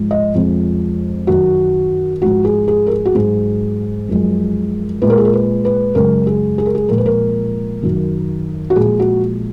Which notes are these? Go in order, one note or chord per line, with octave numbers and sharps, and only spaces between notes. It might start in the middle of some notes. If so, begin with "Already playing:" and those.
Already playing: G#2 F3 G#3
D#5
F2 F3 G#3
F#2 D#3 F#3 F#4
G#2 F3 G#3 F#4
G#4
G#4
A#4
G#4
F#4
G#2 F#3 G#4
F#2 F3 G#3
A#2 G#3 B4
A#4
G#4
A#4
B4
B4
F#2 C#3 G#3 A#4
G#4
G#4
A#4
G#4
A#2 F3 G#3 A#4
B4
A#4
F#2 D#3 F#3
F#4
A#2 F3 G#3 G#4
F#4